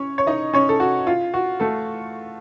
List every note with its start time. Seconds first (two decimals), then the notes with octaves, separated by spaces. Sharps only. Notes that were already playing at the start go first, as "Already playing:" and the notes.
Already playing: C#4 C#5
0.18 C#5
0.27 D#4 D#5
0.53 C#4 C#5
0.69 A4
0.80 F#4
1.07 F4
1.34 F#4
1.60 A3 A4